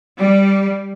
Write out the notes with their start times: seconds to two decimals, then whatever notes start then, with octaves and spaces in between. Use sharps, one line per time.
0.18 G3